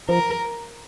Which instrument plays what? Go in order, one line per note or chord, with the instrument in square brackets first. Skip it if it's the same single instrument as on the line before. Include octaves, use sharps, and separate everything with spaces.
[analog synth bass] F3 [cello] A#4